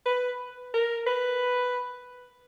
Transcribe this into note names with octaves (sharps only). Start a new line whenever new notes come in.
B4
A#4
B4